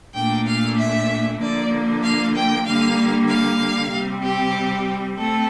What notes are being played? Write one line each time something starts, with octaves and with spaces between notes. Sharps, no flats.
A#2 A3 D4 G5
F5
E5
D3 F3 A#3 D4 D5
F5
G5
D3 G3 A#3 D4 F5
F5
C3 G3 C4
G4
A3 C4 A4